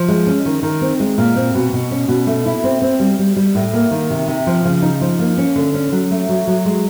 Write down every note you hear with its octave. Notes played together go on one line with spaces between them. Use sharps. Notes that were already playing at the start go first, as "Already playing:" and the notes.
Already playing: F3
G#3
C#4
D#3
D#3
C4
G#3
A#2
C4
B2
B2
C#4
B2
A3
E4
C4
C4
G3
G3
G3
A2
A#3
D#3
C3
C3
F3
C#3
D#4
F3
A#3
C#4
D3
C#4
F#3
A3
F#3
F#3
G#3